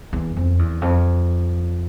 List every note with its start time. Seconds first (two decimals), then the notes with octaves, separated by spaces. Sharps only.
0.13 E2
0.37 F2
0.59 E2
0.82 F2